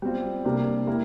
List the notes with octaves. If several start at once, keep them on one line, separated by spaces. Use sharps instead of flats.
G3 C4 F4
C3 G3 A#3 D4
G3 A#3 E4